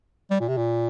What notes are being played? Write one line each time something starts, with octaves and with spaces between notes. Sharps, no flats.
G3
A#2
C3
A#2